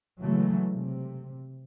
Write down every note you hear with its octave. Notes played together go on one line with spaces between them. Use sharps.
C#3 E3 F#3 G#3 A3
C3